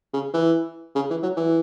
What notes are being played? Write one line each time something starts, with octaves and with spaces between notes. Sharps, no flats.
C#3
E3
C#3
E3
F#3
E3